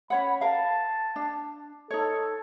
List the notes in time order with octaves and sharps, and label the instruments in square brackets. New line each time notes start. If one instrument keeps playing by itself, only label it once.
[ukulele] C#4 C#5 F#5 [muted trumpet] B5
[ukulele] A#4 F5 [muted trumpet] A5
[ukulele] D4
[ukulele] D#4 C#5 [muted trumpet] A4